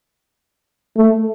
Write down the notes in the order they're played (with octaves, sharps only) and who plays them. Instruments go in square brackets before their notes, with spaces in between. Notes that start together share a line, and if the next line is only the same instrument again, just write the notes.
[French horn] A3